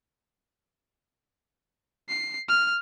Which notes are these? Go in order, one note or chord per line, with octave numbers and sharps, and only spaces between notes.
C7
F6